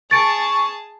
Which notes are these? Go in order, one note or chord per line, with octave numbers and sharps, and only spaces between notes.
G#4 A5 C#6 A6 D7